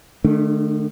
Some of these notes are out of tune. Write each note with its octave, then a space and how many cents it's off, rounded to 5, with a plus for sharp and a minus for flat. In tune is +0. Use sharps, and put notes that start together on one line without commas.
D#3 -45 A3 -20 D4 +0